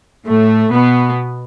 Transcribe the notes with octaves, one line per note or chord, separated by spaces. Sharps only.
A2 A3
B2 B3